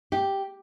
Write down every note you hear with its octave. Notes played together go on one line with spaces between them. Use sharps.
G4